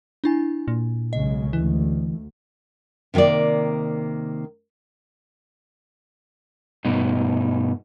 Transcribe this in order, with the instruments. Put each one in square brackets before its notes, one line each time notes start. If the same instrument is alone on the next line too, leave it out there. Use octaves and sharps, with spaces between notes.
[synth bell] D4 E4 G#5
[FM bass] A#2
[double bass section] B1 C#3 G#3 [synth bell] D#5
[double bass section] D2 [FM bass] E3
[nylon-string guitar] C3 D#3 A3 A#3 D5
[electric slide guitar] G2 B2 D#4